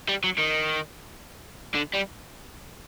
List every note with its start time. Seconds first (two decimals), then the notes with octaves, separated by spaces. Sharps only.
0.08 G3
0.24 F#3
0.39 D#3
1.75 D3
1.95 G3